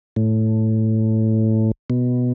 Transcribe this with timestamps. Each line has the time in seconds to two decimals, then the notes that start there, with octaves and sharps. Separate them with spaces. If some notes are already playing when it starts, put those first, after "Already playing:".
0.16 A2
1.90 B2